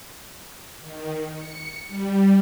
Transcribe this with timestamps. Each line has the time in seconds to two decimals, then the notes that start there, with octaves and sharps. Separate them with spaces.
0.81 D#3
1.34 C#7
1.88 G3